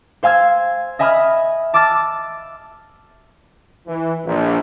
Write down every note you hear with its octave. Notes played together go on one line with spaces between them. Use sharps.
C5 F5 G#5 E6 G#6
D#5 E5 G#5 B5 D#6 F6
A5 D6 E6 F6 A6
E3
A#1